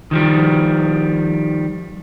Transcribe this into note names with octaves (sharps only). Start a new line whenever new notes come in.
D#3 F3 G3